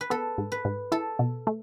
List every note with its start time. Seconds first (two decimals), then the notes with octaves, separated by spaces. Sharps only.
0.01 B4
0.10 B3 A4
0.38 G#2
0.52 B4
0.65 G#2
0.92 E4 A4
1.19 B2
1.47 A3